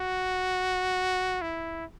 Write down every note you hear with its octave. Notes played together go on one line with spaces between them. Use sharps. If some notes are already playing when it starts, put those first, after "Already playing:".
Already playing: F#4
E4